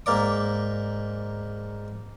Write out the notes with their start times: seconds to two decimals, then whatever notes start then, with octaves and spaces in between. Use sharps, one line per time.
0.06 G#2 A#3 D5 D6